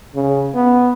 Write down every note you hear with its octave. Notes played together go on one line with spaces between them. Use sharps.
C#3
B3